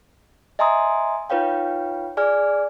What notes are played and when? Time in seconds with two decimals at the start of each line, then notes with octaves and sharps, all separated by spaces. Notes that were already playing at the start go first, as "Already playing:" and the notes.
0.59 D#5 E5 G#5 A#5 C6 D#6
1.30 D#4 F4 B4 C#5 F5 G5
2.17 G#4 D5 G#5 F6